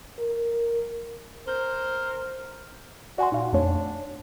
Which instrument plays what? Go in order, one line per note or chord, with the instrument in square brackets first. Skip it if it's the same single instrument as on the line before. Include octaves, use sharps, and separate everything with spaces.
[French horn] A#4
[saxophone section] A#4 C5
[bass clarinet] F#4 [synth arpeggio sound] D5 G#5 C6
[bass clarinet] A#2 [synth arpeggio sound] D#4 F5
[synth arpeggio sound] F2 A3 C#5 [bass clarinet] D4